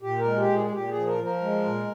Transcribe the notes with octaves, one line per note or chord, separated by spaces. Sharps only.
A#2 G4
A#4
G#3
G4
A#2
G#4
G#4
A#2 G4
G#4
F3
A#4
F3
A#4
G#3
A#2